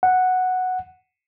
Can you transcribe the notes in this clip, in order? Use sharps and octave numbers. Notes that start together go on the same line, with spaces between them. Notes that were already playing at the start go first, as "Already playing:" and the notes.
F#5